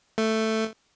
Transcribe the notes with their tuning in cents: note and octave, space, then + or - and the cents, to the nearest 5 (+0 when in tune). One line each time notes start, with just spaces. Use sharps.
A3 +5